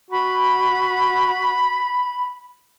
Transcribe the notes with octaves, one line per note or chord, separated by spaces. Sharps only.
F#4 B5